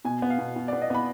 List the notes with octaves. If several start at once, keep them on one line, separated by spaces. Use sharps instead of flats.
B2 G#5
B3
F5
B2
B2
D5
B3
D#5
B3 B5